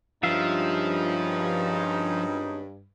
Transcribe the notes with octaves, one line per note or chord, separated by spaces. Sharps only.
G#1 G2 F3 C#4 D#4 F4 E5 F5